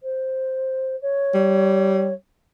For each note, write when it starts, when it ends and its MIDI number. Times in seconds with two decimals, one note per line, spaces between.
0.03 0.96 72
1.02 2.13 73
1.34 2.12 55